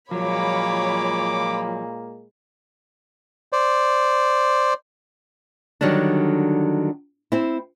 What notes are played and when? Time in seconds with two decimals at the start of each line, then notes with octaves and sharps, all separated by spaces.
0.11 A#2 F3 F#3 G#3 A#3 C#5 B5 D6
3.53 C5 D5
5.81 D3 D#3 F#3 G3 D4
7.32 C4 E4